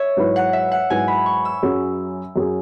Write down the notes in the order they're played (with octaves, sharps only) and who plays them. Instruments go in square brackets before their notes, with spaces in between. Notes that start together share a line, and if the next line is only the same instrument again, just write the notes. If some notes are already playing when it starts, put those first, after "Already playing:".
Already playing: [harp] C#5 E5
[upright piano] G#2 F#3 E4 B4
[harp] F#5
E5
F#5
[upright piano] G#2 F#3 E4 B4 [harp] G#5
[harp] B5
C#6
E6
[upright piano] F#2 F#3 C#4 G#4
F#2 F#3 C#4 G#4